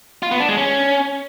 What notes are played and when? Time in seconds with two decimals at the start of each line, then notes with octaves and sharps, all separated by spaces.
0.23 F4
0.31 B3
0.40 D4
0.49 G#3
0.57 C#4